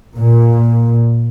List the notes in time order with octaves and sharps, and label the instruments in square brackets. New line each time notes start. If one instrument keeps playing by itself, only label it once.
[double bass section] A#2